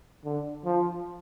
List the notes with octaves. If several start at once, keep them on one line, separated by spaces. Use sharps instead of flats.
D3
F3